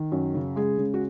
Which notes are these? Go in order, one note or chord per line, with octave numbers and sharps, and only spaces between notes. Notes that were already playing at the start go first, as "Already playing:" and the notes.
Already playing: D#3
F#2
C#3
G#3 G#4
C#3
F#4